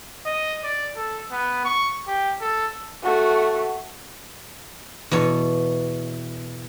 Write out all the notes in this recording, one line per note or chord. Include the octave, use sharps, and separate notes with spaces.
D#5
D5
A4
B3
C#6
G4
A4
A3 F#4
E2 B2 C#5